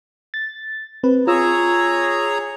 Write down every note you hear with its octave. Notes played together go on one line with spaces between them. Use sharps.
A6
C4 B4
F4 G#4 C#5 A#5 E6